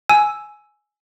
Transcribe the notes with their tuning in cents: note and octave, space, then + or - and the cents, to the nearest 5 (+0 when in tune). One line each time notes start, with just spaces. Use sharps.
G#5 +10 E6 +0